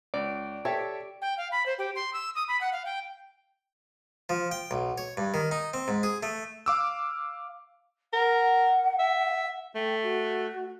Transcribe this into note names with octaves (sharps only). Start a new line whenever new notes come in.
C#2 D5
G4 A4 C#5 E5
G5
F5
B5
C5
G4
C6
E6
D#6
B5
F#5
F5
G5
F3
G5
B1
C#5
G2
D#3
D#4
C4
G#2
G#4
A3
F5 D6 E6
A#4 F#5
E5
A3 G5
F#4